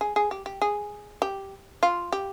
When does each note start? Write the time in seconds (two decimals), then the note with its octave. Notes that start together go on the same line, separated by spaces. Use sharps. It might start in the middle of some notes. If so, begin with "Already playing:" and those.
0.01 G#4
0.16 G#4
0.31 G4
0.46 G4
0.62 G#4
1.22 G4
1.83 F4
2.12 G4